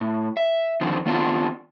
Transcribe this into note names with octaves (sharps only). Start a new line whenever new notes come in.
A2
E5
F2 D3 D#3 C4
D#3 B3 C4 D4 F4